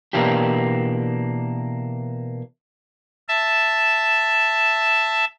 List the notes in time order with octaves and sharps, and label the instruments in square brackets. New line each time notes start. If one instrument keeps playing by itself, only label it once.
[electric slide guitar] B2 E3 A#3 D4 G4
[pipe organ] E5 A5